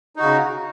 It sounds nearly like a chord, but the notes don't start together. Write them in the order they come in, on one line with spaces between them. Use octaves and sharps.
D#4 F#4 C#3